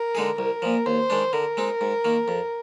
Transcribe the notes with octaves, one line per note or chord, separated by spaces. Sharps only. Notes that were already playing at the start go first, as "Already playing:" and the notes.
Already playing: A#4
D3 G#3 D#4 G#4
C2 A#4
A#2 F3
D#2 C5
D#3 G#3 D4
D3 A#4
G#3 C4 D#4
G#2
D#3 A#3
F2